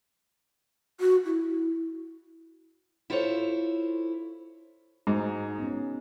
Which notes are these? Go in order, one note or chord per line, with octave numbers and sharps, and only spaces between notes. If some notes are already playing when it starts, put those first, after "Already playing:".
F#4
E4
E4 F4 A4 C5 C#5
G#2 D#4 F#4 G#4
B3 C#4